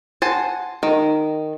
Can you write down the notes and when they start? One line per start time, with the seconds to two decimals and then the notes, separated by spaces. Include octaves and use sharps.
0.22 C5 F#5 G#5 A5
0.83 D#3